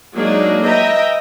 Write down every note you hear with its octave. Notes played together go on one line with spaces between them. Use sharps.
F#3 G#3 A#3 D4 D#4 G#4
B4 D#5 E5 G5 A#5